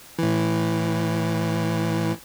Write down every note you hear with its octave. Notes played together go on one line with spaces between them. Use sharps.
A2 E3